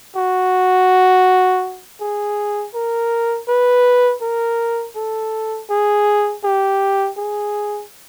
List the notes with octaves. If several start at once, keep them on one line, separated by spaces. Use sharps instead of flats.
F#4
G#4
A#4
B4
A#4
A4
G#4
G4
G#4